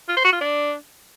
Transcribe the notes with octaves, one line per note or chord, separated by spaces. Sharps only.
F4
C5
F#4
F4
D4